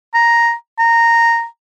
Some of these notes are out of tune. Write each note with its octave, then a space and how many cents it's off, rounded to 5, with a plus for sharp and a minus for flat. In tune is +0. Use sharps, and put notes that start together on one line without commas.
A#5 +5
A#5 -10